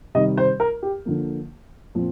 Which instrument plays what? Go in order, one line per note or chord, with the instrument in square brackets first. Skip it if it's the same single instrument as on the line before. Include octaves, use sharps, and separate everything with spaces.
[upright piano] C3 D#3 G3 D#5
C5
A#4
G4
D3 F3 A#3
A#2 F3 C4